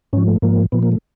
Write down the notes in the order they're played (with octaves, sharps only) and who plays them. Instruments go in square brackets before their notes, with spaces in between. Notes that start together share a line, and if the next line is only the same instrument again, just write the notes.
[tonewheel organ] G#2 F3 C#4
A3
G#2 F3 A#3
A#2 F3 B3
A#3
A3